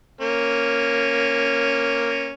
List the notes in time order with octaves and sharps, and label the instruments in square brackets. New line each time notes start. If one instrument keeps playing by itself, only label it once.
[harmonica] A#3 C#4